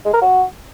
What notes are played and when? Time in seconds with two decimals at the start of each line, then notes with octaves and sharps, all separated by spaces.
0.05 G#3
0.13 A#4
0.22 F#4